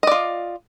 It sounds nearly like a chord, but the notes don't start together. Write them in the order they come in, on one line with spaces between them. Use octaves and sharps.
D#5 D5 F4